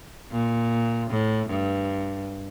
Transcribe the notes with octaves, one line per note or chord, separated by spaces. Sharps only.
A#2
A2
G2